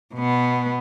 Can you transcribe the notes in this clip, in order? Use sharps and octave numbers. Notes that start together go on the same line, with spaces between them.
B2 B3